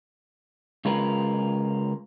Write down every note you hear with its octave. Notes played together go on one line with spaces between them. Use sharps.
C#3 G#3 F4 A#4 B4